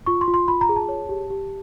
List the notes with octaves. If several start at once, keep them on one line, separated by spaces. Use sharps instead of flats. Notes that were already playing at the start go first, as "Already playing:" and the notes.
F4 C#6
C6
F4
C6
F4 B5
A#5
G#4
A5
C#5
G4
G4